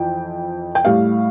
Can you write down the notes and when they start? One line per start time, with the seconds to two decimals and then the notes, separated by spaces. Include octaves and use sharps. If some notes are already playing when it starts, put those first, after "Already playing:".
Already playing: F2 E3 G5
0.75 G5
0.85 A2 G3 F5